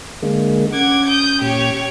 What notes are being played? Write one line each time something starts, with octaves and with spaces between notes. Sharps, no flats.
D3 G#3 A#3
C#4 F#5 D6 G#6
D#6 G6
A#2 G4 C#5